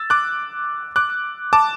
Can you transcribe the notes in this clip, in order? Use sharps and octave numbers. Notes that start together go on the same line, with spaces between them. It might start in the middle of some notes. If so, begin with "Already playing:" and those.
Already playing: E6 A6
D6 F#6
D6 F#6
A5 D6